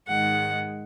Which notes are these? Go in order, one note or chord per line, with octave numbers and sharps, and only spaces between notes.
G#2 D#3 G#3 F#5